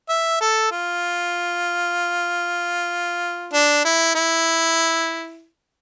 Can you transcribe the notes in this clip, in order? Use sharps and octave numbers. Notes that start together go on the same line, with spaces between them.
E5
A4
F4
D4
E4
E4